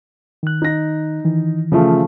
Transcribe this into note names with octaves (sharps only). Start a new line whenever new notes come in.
D#3 F#6
D#4 A#6
D#3 E3
C#3 F3 A3